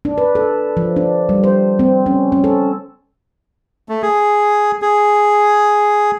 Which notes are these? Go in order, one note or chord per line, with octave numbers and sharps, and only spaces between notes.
D4
B4
A4
F3
D4
G3
C5
C4
C#4
C#4
A4
A3
G#4
G#4